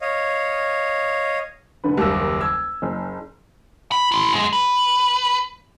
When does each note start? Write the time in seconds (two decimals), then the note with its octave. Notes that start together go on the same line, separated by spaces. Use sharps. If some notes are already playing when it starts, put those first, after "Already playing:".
0.01 C#5 D#5 F5
1.84 F1 D3 B4
1.97 F#1 D#2 G3 A#4 E6
2.41 E6 G#6
2.82 F#1
3.92 B5
4.12 E4 C6
4.33 F#2 G#3
4.53 B4